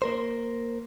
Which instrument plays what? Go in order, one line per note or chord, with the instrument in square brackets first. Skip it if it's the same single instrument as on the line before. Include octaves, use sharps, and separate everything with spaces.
[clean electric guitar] A#3 A#4 C5